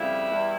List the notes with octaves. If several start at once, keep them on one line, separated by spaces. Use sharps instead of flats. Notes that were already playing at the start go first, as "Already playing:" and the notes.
Already playing: F2 C#3 G3 E4
E2 E3 G3